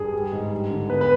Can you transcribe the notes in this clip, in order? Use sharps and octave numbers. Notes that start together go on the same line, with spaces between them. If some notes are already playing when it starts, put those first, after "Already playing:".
Already playing: G2 G#4
G3
G#2
G3
D3
B3 B4
B4